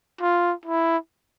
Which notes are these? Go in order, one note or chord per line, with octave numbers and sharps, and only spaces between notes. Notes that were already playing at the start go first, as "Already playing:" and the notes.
F4
E4